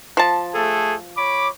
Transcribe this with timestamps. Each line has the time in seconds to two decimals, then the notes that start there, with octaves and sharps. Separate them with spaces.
0.17 F3 A5
0.55 A3 G#4 A4
1.17 C#5 B5 D6